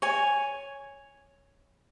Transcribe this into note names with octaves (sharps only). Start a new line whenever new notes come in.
C#5 G#5